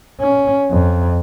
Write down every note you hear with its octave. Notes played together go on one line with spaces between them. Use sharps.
C#4
F2